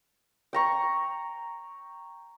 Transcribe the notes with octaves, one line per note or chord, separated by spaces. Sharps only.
G5 A#5 C#6